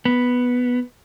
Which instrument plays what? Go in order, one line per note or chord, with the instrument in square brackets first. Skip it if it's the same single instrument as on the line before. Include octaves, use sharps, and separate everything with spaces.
[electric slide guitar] B3